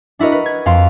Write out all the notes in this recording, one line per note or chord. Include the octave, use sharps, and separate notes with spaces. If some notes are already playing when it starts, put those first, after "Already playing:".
D4 E4 F#4 A#4 D#5
B4
G#6
F2 F5 C6